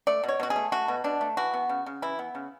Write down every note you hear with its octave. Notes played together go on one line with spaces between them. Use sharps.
A3 D5
B2
C#5
B2 F#4
G#4
A3
A3 F#4
B2
B2 D4
A3
E3 F#4
B3
C#3
C#3
E3 E4
B3
C#3